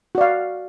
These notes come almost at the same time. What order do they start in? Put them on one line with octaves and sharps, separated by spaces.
F#4 D5 F5